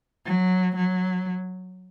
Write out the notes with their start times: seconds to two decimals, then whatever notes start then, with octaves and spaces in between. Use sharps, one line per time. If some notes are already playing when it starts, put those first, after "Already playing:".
0.25 F#3
0.76 F#3